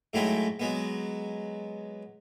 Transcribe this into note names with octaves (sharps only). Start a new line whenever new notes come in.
G#2 F#3 G#3 A3 E4 G5
F#3 G#3 B3